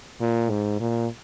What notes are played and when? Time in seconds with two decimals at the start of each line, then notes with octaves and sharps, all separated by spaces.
0.21 A#2
0.50 G#2
0.80 A#2